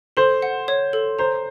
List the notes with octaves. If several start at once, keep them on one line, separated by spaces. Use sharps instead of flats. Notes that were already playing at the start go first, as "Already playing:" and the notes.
A4 C5
F#5
C#5
A4
C5 A#5